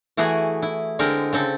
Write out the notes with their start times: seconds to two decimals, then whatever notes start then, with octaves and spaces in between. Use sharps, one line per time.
0.17 E3 A3 E4 F#4 G#4
0.62 E4
0.99 D3 G#3 C4 A#4
1.33 C#3 C4 A4